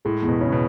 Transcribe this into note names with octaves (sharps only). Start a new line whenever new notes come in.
A2 G#3
E2
B2
C#3 C#4
B2